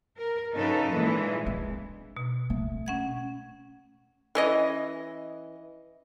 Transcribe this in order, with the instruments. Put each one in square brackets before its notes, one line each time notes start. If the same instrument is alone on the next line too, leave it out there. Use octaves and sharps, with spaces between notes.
[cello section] A#4
F#2 C#3 D#4 A4 B4
A#2 E3 G#3
[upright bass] D4
[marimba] B2
[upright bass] A3
[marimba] C#4 F#5 G#6
[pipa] E3 C#4 D#5